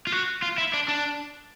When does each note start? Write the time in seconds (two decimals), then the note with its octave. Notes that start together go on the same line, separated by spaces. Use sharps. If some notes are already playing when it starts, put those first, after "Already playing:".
0.07 F4
0.12 F#4
0.42 F4
0.58 E4
0.74 D4
0.89 D4